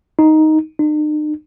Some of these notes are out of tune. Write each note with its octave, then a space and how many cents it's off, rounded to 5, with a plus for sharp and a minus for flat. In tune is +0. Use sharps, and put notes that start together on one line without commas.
D#4 +5
D#4 -45